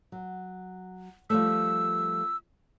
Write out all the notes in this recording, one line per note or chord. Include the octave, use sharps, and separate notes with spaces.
F#3
F3 G3 A3 E6